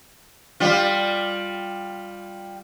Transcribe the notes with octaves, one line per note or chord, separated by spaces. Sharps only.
G3 F4